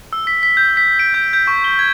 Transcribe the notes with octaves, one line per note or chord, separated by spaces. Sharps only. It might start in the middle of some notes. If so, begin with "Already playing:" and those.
E6
B6
B6
G6
B6
D7
G6
G6
C#6
G7
G#6